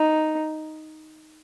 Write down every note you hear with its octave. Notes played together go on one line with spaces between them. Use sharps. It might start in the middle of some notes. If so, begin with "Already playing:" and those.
Already playing: D#4